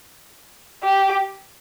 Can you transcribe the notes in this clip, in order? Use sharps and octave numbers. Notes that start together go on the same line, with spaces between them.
G4